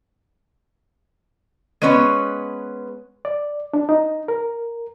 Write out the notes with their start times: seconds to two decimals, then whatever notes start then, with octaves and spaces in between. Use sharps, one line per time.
1.82 G#3 B3 C#4 B4 C#5
3.25 D5
3.74 D4
3.89 D#4
4.28 A#4